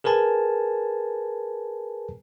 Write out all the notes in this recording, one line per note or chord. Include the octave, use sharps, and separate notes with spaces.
G#4 A#4 B4 G#5 A5